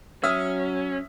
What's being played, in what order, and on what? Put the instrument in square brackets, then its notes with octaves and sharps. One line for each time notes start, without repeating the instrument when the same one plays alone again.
[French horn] F#3 [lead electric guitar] C#4 [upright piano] E5 D#6 F6